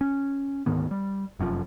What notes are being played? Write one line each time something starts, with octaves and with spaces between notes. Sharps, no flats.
C#4
D2 G#2 D#3 B3
G3
F1 F#2 B2 F3